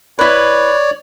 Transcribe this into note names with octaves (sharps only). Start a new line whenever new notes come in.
E4 B4 C#5 D5